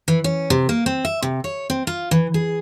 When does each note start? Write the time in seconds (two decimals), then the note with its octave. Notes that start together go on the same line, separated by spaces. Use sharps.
0.08 E3
0.24 C#4
0.50 C3
0.69 A#3
0.86 C4
1.05 E5
1.22 C3
1.44 C#5
1.70 C4
1.87 F4
2.11 E3
2.34 G#4